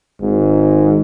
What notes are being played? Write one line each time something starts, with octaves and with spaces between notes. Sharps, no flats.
G#1 G#2